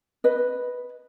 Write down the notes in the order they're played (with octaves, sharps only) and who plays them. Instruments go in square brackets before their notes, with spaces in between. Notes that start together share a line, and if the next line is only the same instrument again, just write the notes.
[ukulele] B4 D#5